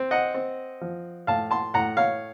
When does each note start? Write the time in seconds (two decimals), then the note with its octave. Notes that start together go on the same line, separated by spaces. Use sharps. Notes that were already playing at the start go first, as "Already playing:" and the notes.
Already playing: C4
0.11 D#5 F#5
0.34 C4
0.81 F3
1.27 A2 F5 A5
1.51 A5 C6
1.74 A2 F#5 A#5
1.97 C#5 F5